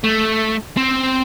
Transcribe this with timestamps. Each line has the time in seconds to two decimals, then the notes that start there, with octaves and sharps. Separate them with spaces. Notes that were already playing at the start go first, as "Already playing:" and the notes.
0.04 A3
0.77 C4